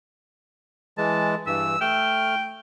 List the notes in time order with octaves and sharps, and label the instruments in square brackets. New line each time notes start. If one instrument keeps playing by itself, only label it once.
[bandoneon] E3 G#3 [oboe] A5
[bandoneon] G2 E3 [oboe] E6
[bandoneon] A3 F6 [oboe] G5